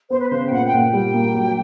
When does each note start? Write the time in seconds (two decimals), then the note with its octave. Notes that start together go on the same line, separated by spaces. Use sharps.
0.10 B3 C5
0.20 B4
0.29 C#3 C5
0.47 G5
0.52 A#2 F#5
0.66 G5
0.73 A#2
0.80 G5
0.93 G3 G5
1.13 A#3
1.35 F#3